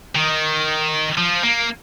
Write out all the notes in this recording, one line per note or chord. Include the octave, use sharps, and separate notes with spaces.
D#3
F3
A#3